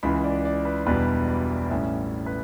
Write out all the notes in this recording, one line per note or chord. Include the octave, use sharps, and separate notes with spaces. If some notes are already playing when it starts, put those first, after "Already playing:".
C#2 C#3 E3 B5
D5
D5
B4
E1 E2 B2 G3 D4 B4
D5
A1 A2 G3 C#4 E5
B4